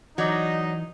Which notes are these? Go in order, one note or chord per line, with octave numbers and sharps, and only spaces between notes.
E3 F#3 D#4 D5 D#5